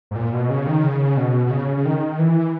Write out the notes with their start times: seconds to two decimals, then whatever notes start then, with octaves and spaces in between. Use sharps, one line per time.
0.11 G#2
0.16 A#2
0.33 B2
0.50 C#3
0.67 D#3
0.83 C#3
1.17 B2
1.46 B2
1.51 C#3
1.77 C#3
1.85 D#3
2.19 E3